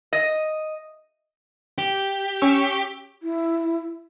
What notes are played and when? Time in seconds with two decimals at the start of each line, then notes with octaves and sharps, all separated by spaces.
0.13 D#5
1.78 G4
2.42 C#4 C#6 E6
3.23 E4